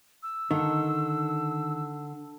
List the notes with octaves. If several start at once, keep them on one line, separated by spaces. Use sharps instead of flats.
E6
D3 D#3